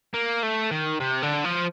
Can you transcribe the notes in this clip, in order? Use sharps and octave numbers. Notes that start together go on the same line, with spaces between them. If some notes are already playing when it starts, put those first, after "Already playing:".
A#3
A3
D#3
C3
D3
F3